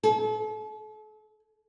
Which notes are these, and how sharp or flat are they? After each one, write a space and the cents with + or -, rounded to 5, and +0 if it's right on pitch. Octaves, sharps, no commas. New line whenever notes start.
A4 -40